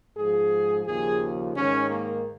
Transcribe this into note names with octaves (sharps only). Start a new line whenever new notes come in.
G#2 F3 G#4
D#2 C#3 F3 G#4
G#2 D#3 C#4
A#3